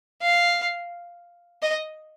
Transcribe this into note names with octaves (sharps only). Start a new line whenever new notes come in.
F5
D#5